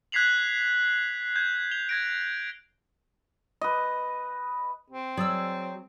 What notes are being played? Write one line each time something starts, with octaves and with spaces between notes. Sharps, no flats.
F#6 G#6 B6 C7 F7 F#7
G6 G#6
F7 G7
G#6 A#6 D7
B4 D#5
C4
F#3 G#4 D5 E6